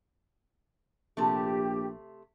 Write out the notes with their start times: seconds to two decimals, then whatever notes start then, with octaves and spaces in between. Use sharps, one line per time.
1.17 A#1 C3 A3 G4